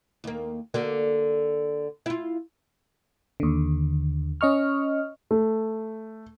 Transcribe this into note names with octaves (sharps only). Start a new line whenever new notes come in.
D#2 A#3
D3 A#3 F#4
E4 F4
D#2 D3
C#4 D#5 C#6 F6
A3